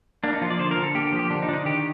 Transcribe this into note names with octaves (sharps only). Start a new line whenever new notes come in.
A#3 D4
D#4
F3 F4
D5
D3 C5
A#4
D3
A4
A#3 G4
G4
F3
G4
D3 D4
D#4
D3 D4
D#4
D#3 G4